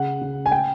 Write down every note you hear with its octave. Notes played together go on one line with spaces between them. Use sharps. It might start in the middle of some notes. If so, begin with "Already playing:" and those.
Already playing: C#3 F#5
C#3
G#5
G5